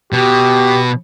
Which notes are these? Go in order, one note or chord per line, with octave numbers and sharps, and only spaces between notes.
B2 G4